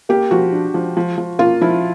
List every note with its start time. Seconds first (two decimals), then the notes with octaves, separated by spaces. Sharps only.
0.09 A#3 G4
0.31 F3 F#4
0.52 D4
0.74 F3
0.97 F3
1.18 F3
1.39 A#3 F4
1.61 F3 E4